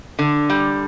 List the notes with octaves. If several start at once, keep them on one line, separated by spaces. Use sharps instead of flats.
D3
G3